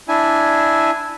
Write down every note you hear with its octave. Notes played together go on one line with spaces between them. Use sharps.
D4 E4 G#5